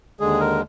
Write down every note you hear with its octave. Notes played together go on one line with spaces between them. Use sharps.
D#2 D3 G#3 G#4
A#4